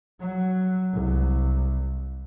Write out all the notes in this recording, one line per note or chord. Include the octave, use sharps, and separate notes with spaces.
F#3
C2